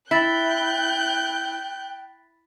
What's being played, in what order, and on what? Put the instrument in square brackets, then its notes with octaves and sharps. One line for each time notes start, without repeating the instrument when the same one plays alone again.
[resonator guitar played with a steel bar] E4 [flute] G5 [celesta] B5 A6 B6 [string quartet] F#6 G6